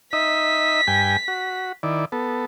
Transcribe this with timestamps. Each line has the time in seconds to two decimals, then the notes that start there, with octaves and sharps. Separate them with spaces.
0.13 D#4 D#5 E5 B6
0.87 G2 G5 G#5
1.28 F#4
1.83 D#3 E4 D5
2.12 B3 A4